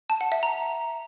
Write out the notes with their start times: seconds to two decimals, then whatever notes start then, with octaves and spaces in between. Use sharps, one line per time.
0.10 A5
0.21 F#5
0.32 E5
0.43 A#5